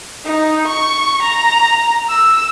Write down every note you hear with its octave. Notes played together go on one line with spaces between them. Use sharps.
D#4
C#6
A#5
E6